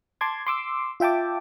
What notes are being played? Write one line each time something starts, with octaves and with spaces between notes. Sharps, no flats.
A5 C6 D6 G#6
C6 D6 E6
F4 E5 G5 A5 D6